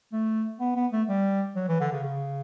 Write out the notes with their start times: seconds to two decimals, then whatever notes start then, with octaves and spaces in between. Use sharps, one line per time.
0.13 A3
0.60 B3
0.76 B3
0.92 A3
1.08 G3
1.55 F#3
1.69 E3
1.80 D3
1.92 C#3
2.04 C#3